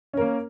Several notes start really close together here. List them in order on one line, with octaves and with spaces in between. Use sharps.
C#4 A#4 A#3